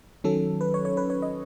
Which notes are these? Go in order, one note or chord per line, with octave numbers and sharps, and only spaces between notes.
D#3 F#3 C#4 A4
B4
C#5
C#5
B4
C#5
D#5